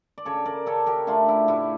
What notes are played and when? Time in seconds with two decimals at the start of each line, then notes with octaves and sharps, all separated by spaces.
0.18 D5
0.25 C#3 A4 C#5
0.46 A#4 D5
0.66 C#3 A4 C#5
0.86 G4 A#4
1.07 A3 D4 F4
1.29 E4
1.48 A2 E4